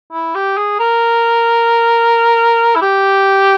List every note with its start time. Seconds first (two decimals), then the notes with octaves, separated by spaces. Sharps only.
0.13 E4
0.35 G4
0.57 G#4
0.79 A#4
2.75 E4
2.82 G4